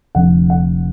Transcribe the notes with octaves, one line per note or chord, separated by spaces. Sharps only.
F1 F2 D3 F#5
F#5